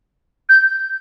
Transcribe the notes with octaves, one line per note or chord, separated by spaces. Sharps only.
G6